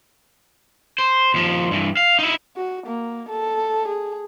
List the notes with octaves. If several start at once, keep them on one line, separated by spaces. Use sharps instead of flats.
C5
D#2 F3
G2 E3
F5
D#4 E4
F#4
A#3
A4
G#4